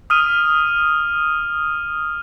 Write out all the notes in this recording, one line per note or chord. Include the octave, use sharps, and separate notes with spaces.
D#6 F6 D#7